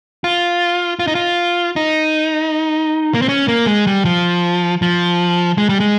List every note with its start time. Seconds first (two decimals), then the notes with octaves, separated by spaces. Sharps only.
0.24 F4
0.99 F4
1.07 D#4
1.15 F4
1.76 D#4
3.14 A#3
3.22 C4
3.29 C#4
3.48 A#3
3.67 G#3
3.87 G3
4.05 F3
4.82 F3
5.58 G#3
5.69 G3
5.80 G#3